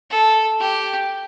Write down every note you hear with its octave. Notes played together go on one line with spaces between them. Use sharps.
A4
G4